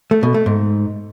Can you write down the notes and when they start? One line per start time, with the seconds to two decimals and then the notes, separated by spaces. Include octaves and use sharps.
0.11 A3
0.23 B2
0.34 A3
0.46 G#2